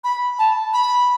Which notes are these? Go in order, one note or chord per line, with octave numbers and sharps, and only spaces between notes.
B5
A5
B5